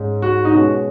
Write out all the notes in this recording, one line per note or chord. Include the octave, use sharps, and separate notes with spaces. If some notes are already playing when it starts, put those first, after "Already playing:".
Already playing: G#2 G#3 C#4
F#4
D#4
B2 G#3 C#4 F#4